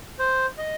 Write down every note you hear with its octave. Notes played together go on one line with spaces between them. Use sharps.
C5
D#5